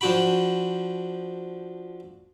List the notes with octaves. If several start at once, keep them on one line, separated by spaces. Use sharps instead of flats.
F3 D4 F#4 G5 B5